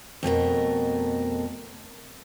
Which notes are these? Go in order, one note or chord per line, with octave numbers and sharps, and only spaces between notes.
F2 B2 A3 A#4